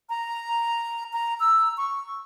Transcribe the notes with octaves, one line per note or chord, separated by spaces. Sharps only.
A#5
A#5
E6
C#6